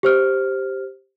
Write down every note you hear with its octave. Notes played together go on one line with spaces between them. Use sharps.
G4 C5 F6